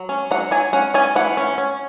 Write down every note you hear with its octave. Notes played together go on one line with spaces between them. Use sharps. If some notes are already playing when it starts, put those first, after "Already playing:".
Already playing: F#3
C#4
F#3 F#5
F#3 G#5
C#4 F#5
C#4 G#5
E3 F#5
C#4
C#4